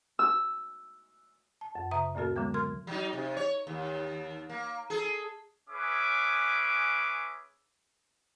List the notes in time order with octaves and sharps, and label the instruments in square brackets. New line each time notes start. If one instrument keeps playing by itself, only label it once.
[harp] E6
[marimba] A5
F#2
C#3 E5 A#5 D#6
D2 A#2 A#3 F#4 A#4
D3 F#3 G#3 B3
A#4 C6 F6 G#6
[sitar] F#3 D#4
C3
C#5
D#2
A#3
G#4 A4
[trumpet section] C#4 G#4 B4 E5 D6